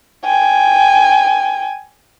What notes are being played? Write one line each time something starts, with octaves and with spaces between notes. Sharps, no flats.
G5 G#5